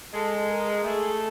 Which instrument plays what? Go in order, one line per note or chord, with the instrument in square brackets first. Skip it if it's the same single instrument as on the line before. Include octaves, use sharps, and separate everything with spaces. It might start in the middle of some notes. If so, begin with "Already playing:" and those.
[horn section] G#3 [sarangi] A4
[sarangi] A#4
[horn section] A3 [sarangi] G#4